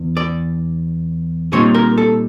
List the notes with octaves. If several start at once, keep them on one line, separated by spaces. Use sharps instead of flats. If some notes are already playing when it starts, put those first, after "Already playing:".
Already playing: E2
D5
A#2 G3 C4 D#4 C#5
A#4
A4